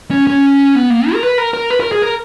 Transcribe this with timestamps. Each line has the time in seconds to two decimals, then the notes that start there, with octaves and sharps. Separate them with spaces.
0.11 C#4
0.27 C#4
0.75 B3
0.90 A#3
1.07 E4
1.15 A#4
1.23 B4
1.38 A#4
1.54 A#4
1.71 B4
1.80 A#4
1.92 G#4
2.02 A#4